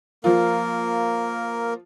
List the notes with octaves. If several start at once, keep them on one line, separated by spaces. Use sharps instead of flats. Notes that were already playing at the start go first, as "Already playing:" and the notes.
F3 A#3 F4 A#4